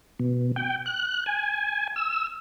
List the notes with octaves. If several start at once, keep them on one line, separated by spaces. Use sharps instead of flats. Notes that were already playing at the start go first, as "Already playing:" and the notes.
B2
G5
F#6
G#5
E6